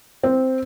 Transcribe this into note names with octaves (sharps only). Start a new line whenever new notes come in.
C4